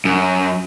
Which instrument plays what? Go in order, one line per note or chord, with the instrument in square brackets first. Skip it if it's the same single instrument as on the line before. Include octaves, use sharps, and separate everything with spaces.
[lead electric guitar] F#2